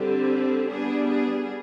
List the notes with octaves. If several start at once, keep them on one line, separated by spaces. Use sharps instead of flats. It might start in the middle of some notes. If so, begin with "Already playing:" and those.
Already playing: D3 G3 C4 G4
G3 B3 D4 G#4
G#4